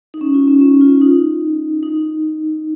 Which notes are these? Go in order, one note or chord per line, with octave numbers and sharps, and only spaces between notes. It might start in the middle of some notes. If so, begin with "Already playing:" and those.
D#4
C#4
F4
C#4
C#4
F4
D#4
D#4